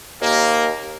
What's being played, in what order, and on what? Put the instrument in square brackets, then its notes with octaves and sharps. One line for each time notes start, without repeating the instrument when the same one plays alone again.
[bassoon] D#2 [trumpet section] A#3